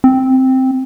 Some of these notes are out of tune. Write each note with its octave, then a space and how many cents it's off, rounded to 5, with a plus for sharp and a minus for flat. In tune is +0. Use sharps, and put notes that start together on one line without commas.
C4 +0